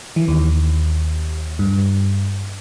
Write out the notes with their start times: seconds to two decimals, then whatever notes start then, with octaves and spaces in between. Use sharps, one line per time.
0.16 E3
0.28 D#2
1.59 G2